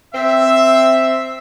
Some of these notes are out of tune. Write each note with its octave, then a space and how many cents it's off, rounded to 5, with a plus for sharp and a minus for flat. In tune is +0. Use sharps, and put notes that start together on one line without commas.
C4 +0 E5 +0